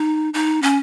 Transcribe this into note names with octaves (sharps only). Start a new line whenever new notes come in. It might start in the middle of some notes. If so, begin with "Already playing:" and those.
Already playing: D#4
D#4
C#4